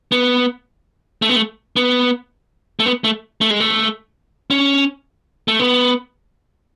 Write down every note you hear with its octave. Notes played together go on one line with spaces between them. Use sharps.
B3
A3
B3
A3
B3
A3
B3
A3
A3
G#3
A3
C#4
A3
B3